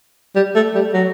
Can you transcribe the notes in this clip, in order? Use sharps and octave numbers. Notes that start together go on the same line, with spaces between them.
G3
A3
G3
F#3